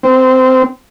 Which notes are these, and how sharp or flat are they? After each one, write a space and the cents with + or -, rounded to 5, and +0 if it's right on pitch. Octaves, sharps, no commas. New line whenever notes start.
C4 -15